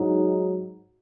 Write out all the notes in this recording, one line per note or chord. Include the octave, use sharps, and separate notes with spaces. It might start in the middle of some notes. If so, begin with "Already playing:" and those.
Already playing: G#2 F#3 D#4